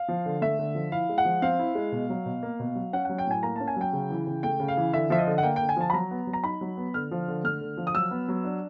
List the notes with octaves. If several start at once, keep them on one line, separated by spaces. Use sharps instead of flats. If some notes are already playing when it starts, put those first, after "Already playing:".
Already playing: F5
F3
D3
A3 E5
D3
F3
E4 F5
G#3
F#5
F3
C4 F5
E4
G#3
B2
F#3
B2
A#3
B2
F#3
C#4 F#5
F#3 F#5
G5
A2 G#5
A#3 A#5
C#4 A5
G#5
F#3 G5
C#3
E3
C#3
A3 G5
C#3
F5
E3
D3 E5
F3 E5
D#5
D3
F#5
A#3 G5
D3 G5
G#5
F3 A5
B5
F#3 A#5
B3
F#3
A#5
D#4 B5
F#3
B3
D3 F6
F3
D3
A3 F6
D3
F3
D#6
F#3 E6
B3
F#3
D4